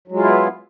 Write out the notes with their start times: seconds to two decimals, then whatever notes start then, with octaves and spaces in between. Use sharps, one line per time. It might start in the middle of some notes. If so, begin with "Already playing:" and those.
0.08 F#3
0.12 G#3
0.16 F4
0.20 E4
0.24 B3